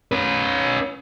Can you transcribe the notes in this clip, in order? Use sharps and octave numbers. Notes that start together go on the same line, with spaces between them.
C#4 B4